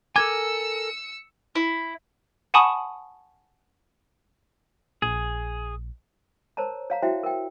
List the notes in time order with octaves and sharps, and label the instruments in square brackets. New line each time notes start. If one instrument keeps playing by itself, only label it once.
[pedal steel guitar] A4 A#4 G#5 [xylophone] D6 G#6 [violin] E6 C#7
[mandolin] E4
[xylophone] F#5 G#5 A5 B5 C#6 D#6
[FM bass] A#1 [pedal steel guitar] G#4
[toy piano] A#4 C5 C#5 A5 A#5
C#5 F5 A#5
E4 F#4 C5 E5 G5
A#4 G5